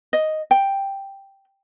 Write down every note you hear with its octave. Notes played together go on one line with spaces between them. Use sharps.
D#5
G5